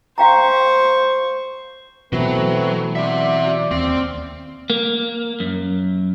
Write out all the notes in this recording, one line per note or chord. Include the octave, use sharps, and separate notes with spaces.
C5 F5 G5 A#5 C#6
B2 E3 F#3 A3 C4 B4
F#3 C4 D5 E5
D#2 C4 F5
A#3
F#2